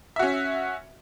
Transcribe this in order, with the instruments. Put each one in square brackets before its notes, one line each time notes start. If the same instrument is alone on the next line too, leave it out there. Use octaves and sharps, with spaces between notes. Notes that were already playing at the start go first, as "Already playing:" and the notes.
[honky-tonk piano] E5
F#4
C#4